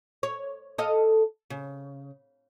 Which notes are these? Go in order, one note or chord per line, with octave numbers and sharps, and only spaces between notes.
C#5
A4 D#5 F5
C#3